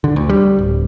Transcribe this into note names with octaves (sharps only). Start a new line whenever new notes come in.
D3
D2
G3
D1